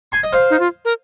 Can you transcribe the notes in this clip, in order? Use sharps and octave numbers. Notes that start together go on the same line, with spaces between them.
G#5 C6
D#5
C5 F5
D#4
F4
A#4